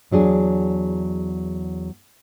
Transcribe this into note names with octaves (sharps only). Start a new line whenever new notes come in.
E2 F#3 D4 G#4